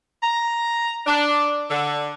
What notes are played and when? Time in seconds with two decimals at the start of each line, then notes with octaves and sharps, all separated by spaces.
0.22 A#5
1.07 D4
1.69 D3